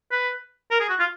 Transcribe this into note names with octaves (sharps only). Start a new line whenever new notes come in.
B4
A#4
G#4
F#4
F4